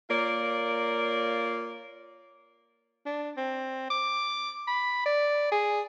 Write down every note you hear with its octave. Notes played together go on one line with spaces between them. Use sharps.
A#3 F4 A#4 C#5 D5
D4
C4
D6
B5
D5
G#4